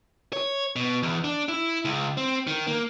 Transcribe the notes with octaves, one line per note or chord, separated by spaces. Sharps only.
C#5
B2
E2
D4
E4
C#2
C4
D#3
A#3